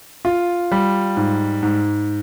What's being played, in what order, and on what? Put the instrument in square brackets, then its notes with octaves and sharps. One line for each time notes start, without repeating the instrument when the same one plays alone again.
[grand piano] F4
G3
G#2
G#2